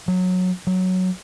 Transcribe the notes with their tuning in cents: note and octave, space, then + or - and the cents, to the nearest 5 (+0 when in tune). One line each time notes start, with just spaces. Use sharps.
F#3 -15
F#3 +0